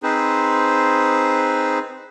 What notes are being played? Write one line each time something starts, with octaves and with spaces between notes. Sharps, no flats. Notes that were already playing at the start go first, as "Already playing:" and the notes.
C4 D#4 G#4 B4 C5